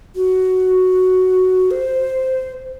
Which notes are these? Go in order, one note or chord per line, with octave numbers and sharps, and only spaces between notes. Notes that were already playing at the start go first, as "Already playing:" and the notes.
F#4
C5